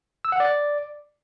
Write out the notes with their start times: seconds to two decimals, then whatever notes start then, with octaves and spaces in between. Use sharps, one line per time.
0.25 E6
0.32 F#5
0.40 D5